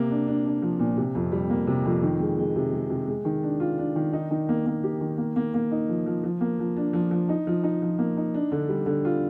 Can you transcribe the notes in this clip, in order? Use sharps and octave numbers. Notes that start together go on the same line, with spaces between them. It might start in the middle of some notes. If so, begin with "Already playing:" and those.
Already playing: C3 A#3
D4
D4
D4
F3
A#2
C3
F2
G3
A#3
C3
F2
D#3
G#3
G#3
C3
G#3
C3
G#3
D#3
D4
F4
D4
D#3
D#4
D#3
A#3
A#3
G4
D#3
A#3
A#3
A#3
D#4
F3
F3
F3
A#3
F3
D4
F3
F3
D#4
F3
D#4
F3
A#3
D#4
D4
D3
G3
D3
F4